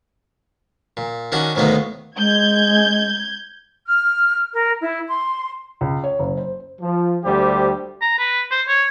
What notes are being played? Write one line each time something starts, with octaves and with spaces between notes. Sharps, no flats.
A#2
D#3 C#4 D4 F#4
D2 A2 D#3 F#3 A#3 B3
G#3 G6 G#6
F6
A#4
E4
C6
C#2
C#5
F#1
C5
F3
D2 G3 F#4 G4 C5
A#5
B4
C5
C#5